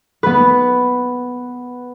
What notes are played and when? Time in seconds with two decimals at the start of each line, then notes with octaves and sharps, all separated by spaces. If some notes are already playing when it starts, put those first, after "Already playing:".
0.23 B3 B4